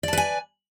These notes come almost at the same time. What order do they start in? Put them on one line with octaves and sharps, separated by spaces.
D5 A5 B4 G#5